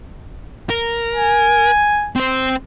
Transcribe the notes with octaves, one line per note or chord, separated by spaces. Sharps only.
A#4
G#5
C4 C5